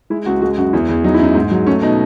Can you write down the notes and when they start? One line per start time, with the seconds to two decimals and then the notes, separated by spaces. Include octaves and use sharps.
0.10 G#3 E4
0.26 C#2 F#4
0.42 G#3 F#4
0.57 F#2 F#4
0.73 E2 E4
0.89 E2
1.04 F#3 D#4
1.14 E4
1.20 F#2 D#4
1.35 G#2
1.51 F#3
1.67 A3 C#4
1.82 B2 D#4